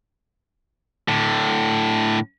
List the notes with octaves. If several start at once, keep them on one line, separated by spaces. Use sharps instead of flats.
A2 D3